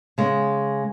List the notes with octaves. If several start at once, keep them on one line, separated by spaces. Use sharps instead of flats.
C#3 G#3 B3